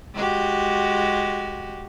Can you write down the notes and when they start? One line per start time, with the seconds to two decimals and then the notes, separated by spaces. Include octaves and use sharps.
0.14 G#3 F#4 G4